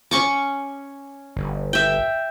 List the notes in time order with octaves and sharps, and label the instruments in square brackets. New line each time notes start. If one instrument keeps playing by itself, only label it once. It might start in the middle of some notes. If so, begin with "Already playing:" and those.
[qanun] C#4 C#6 D6
[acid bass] G1
[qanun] E5 G5